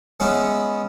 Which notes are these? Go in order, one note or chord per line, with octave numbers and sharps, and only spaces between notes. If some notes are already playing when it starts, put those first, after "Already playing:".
G#3 B3 C#4 E4